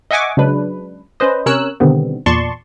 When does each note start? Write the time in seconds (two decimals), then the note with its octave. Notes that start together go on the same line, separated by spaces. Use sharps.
0.11 D#5 E5 F#5 G#5 C#6 D6
0.37 C#3 F#3 G#3 D4 B4
1.20 C#4 B4 C5 D#5
1.46 C3 C#4 A#4 C#5 E6 F#6
1.80 B2 D3 D#3 G3 B3 C4
2.26 E2 A#2 D5 A5 C6 C#6